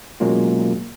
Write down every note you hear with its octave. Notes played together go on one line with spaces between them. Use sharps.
B2 F#3 G#3 A#3 C#4 F4